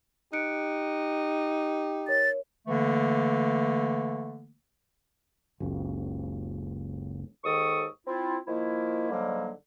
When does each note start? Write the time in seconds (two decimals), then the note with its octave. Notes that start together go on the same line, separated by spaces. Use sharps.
0.33 D#4 G4 F#6 C#7 D7
2.08 A#4 C#5 A6
2.68 D3 E3 A3 A#3
5.60 F#1 C#2
7.44 D#2 G#2 D#3 A4 C#6 D#6
8.07 C4 E4 F4
8.47 D#3 F3 A#3 E4
9.11 G#2 D3 F#3 G3 A#3